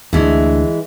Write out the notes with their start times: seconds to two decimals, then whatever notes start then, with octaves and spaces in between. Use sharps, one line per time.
0.13 D2 E3 G#3